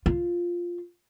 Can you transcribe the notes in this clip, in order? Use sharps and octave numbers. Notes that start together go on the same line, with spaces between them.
F4